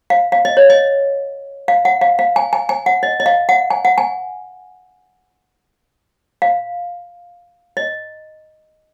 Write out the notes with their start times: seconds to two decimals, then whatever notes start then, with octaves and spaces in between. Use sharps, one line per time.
0.10 F5
0.32 F5
0.45 D#5
0.57 C#5
0.70 D#5
1.68 F5
1.85 F#5
2.01 F5
2.19 F5
2.36 G#5
2.53 G#5
2.69 G#5
2.86 F#5
3.03 D#5
3.20 D#5
3.26 F5
3.49 F#5
3.70 G#5
3.85 F#5
3.98 G#5
6.42 F5
7.77 D#5